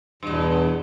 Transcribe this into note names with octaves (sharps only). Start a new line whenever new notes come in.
E2 G2 B2